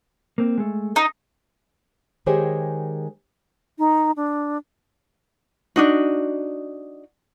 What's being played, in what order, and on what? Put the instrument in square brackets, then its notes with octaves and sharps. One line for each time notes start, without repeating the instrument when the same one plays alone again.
[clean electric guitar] A#3 C4
G#3 A3
[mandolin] D#4
[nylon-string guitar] D#3 G#3 G4 G#4 C5 C#5
[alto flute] D#4
D4
[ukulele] D4 D#4 F#4